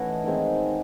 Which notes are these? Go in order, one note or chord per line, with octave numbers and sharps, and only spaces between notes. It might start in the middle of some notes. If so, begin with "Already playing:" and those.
Already playing: E3 A3 C#4 E4 D#5 F#5
D#3 G#3 C4